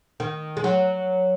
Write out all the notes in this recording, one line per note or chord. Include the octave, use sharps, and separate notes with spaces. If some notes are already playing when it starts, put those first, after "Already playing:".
D#3
G#3
F#3